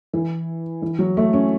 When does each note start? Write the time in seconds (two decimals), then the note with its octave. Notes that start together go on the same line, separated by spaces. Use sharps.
0.13 E3
0.82 E3
0.99 F#3
1.17 A3
1.33 C#4